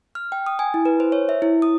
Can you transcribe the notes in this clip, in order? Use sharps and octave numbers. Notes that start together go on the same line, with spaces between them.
F6
G5
D#6
G#5
E4
B4
C5
C#5
E5
E4
D#6